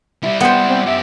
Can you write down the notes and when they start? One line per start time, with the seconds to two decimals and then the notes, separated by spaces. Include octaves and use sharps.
0.23 G3 E4 E5
0.40 B3 C5 G5
0.68 C4
0.86 F#2 G4 E5